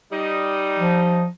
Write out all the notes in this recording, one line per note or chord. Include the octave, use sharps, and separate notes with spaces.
G3 D#4
F3